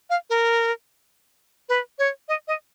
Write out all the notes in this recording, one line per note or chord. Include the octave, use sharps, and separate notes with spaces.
F5
A#4
B4
C#5
D#5
D#5